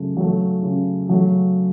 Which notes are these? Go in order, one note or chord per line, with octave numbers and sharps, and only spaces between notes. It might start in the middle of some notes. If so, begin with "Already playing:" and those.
Already playing: C#3 F#3 A3
F#3 A3
C#3
F#3 A3